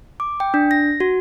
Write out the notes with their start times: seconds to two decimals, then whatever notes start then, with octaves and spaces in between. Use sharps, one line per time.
0.20 D6
0.40 G5
0.54 D4
0.71 A#6
1.00 F#4